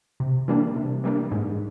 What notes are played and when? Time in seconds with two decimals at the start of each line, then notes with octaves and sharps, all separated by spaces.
0.20 C3
0.48 E3 G3 A#3 D4
0.76 C3
1.04 E3 G3 A#3 D4
1.32 G#2